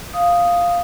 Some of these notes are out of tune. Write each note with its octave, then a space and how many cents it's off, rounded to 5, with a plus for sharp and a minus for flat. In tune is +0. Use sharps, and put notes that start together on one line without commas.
F5 +0 D#6 +0